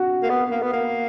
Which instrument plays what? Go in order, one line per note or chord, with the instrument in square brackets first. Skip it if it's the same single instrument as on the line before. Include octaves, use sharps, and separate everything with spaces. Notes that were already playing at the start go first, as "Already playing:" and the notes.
Already playing: [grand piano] F#4
[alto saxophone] A#3
B3
A#3
B3
A#3